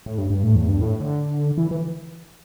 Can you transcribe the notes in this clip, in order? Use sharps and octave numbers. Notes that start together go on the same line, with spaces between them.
A2
G2
G2
A2
E2
G2
A2
D3
E3
E3